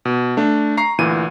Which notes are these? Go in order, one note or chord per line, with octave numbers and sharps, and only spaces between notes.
B2
A3 D4
A#5 C#6 C7
D2 A#2 E3 D#7